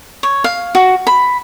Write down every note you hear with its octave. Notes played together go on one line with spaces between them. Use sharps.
C#5
F5
F#4
B5